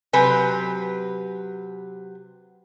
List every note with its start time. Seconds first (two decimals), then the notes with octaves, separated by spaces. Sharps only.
0.13 C3 F#3 B4 G#5